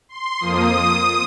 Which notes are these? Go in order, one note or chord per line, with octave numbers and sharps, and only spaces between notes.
C6
F2 F3 A#3 D#6